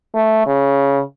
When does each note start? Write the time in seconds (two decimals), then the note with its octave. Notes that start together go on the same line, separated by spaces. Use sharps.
0.15 A3
0.46 C#3